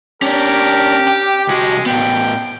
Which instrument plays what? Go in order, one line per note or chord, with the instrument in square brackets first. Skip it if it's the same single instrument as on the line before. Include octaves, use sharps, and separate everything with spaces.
[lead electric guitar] C#4 D4 [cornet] G4 [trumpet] A#4
[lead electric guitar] G5
[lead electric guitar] C2 F#4 [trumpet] G#3
[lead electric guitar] A2 B3 [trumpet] G5